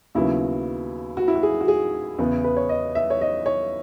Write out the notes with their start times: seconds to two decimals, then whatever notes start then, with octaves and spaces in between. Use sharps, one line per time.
0.15 D#2 C#3 F#3 B3 E4
1.17 F#4
1.28 E4
1.35 F#4
1.43 G#4
1.61 F#4
1.68 G#4
2.19 E2 C#3 E3 B3
2.44 B4
2.57 C#5
2.69 D#5
2.95 E5
3.10 C#5
3.21 D#5
3.46 C#5